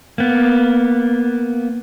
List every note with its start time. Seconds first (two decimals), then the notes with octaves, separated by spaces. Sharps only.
0.18 A#3 B3